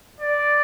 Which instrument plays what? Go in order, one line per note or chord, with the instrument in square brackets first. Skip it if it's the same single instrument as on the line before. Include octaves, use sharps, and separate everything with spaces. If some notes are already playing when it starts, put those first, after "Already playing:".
[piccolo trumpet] D5